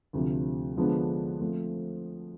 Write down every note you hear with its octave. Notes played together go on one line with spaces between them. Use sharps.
D2 C3 F3
D3 F3 G#3 B3 D4
F3 A3 C4